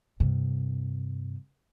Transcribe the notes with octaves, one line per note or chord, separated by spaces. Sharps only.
G2 C3